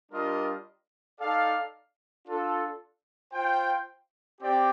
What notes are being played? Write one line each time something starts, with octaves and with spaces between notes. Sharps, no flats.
G3 D4 F4 A#4 D#5
D#4 A4 D5 F5
D4 F4 A4
F4 C5 G5
C4 G4 D5 G5